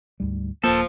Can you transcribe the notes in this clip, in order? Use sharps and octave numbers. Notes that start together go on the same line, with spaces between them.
D2 G#2 G3
D#1 F3 A#3 A4